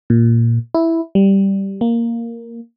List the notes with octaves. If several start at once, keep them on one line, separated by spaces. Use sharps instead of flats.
A#2
E4
G3
A#3